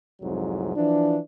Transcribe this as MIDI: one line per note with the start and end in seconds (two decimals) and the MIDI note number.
0.22 0.74 36
0.22 0.74 41
0.22 0.74 44
0.22 0.74 54
0.76 1.18 52
0.76 1.18 53
0.76 1.18 62